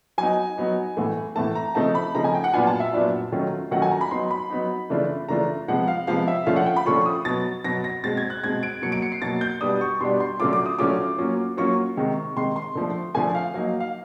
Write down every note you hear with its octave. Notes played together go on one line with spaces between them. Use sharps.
F#3 B3 D#4 G#5
F#3 B3 D#4
A2 E3 A3
A2 E3 A3 A5
A#5
C#3 F3 A3 C4 D#4 A5
B5
C#3 F3 A3 C4 D#4 A#5
G#5
G5
F#5
A#2 F#3 B3 D4 F4 G#5
A5
E5
A#2 F#3 B3 D4 F4
D#3 F#3 A3 C#4 F4
D#3 F#3 A3 C#4 F4 F#5
G#5
A#5
B5
F#3 B3 D#4 C6
B5
F#3 B3 D#4
C#3 E3 A3 D4 F4
C#3 E3 A3 D4 F4 A#5
C3 F3 G#3 B3 F#5
F5
C3 F3 G#3 B3 F5
E5
D3 F3 A3 C#4 F4 F5
F#5
G5
B5
D3 F3 A3 C#4 F4 C#6
D#6
B2 F#3 B3 A6
B2 F#3 B3 A#6
A#6
B2 G#3 C4 A6
G#6
F#6
B2 G#3 C4 G#6
D7
B2 F#3 A#3 C#7
D7
C#7
C7
B2 F#3 A#3 A6
G6
B2 G3 B3 D4 D#6
C#6
B2 G3 B3 D4 C6
C6
D3 F#3 A3 C#4 F4 D6
D6
D#6
D3 F#3 A3 C#4 F4 D6
F#3 A#3 C#4 F4
F#3 A#3 C#4 F4 C#6
C3 D#3 G#3
C3 D#3 G#3 C6
C6
D3 F3 A3
D3 F3 A3 G#5
F5
F#3 A#3 D#4 F5
F5